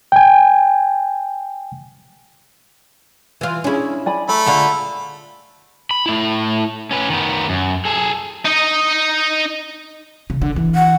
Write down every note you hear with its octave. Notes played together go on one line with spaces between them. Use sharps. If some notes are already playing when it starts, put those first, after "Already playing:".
G5 G#5
E3 F4
C#4 D4 E4 G#4
D5 G#5 B5
A3 A#5 B5
D3 F4 G#4
B5
A3 E4
C#4 B4
D#3 B3
F#2
G#4 A4
D#4 D#5
C#3
D3
E3
F#5